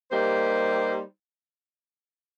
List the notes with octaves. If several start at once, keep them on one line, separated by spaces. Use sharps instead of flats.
G3 A#3 D#4 G4 C5